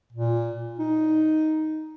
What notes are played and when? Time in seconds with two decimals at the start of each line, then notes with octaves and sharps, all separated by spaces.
0.13 A#2
0.79 D#4